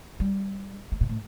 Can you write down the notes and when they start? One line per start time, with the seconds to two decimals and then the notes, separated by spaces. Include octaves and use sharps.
0.20 G3
0.92 A3
1.01 A#2
1.09 A2